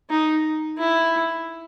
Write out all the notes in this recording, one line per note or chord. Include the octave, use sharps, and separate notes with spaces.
D#4
E4